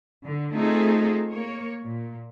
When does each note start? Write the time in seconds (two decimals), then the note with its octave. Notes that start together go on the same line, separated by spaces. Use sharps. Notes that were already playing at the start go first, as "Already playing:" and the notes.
0.22 D3
0.55 A3 C4 D#4 F4 G#4 A4
1.29 A#3 C#5
1.83 A#2